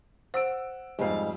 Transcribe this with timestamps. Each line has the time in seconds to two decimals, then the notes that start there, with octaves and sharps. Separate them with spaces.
0.34 C5 F#5 E6 D7
0.99 F2 G#2 G3 F5